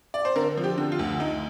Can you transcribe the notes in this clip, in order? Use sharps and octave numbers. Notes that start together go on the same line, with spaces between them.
D5
C5
D3 A#4
F3
G4
D3
F4
D2
D2 D#4